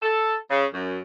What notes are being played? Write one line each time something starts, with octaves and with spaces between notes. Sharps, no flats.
A4
C#3
F#2